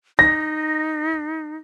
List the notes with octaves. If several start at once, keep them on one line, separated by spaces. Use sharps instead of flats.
D#4 A#6